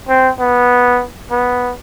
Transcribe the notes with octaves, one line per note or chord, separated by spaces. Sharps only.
C4
B3
B3